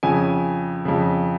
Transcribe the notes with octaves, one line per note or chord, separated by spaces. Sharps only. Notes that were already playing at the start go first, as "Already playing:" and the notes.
F2 C#3 G#5
F2 C#3